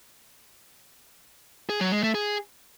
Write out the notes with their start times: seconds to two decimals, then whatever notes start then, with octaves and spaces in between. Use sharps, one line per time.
1.69 G#4
1.81 F#3
1.92 G#3
2.03 A3
2.15 G#4